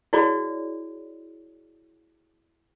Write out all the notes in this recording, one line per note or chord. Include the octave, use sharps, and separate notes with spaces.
E4 F#4 G#4 C#5 D5 B5